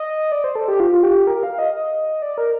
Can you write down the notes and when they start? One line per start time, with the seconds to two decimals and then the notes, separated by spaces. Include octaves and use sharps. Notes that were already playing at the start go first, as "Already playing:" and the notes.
Already playing: D#5
0.32 D5
0.44 C5
0.55 A4
0.68 G4
0.80 F4
0.92 F4
1.03 G4
1.27 A#4
1.43 F5
1.59 D#5
1.74 D#5
2.22 D5
2.38 A#4